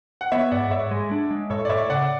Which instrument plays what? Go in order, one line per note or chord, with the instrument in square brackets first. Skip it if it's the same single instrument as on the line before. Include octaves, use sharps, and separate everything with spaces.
[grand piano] F#5
[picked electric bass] B3 [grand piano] C#5 E5
[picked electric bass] G#2 [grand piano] D5 F#5
[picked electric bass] G#2 [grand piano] C#5 E5
[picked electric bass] G#3
D4
G#3
[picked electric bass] A2 [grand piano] A4 C#5
[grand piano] D5
[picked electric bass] A2 [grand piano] C#5 E5
[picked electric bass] C#3 [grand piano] D5 F#5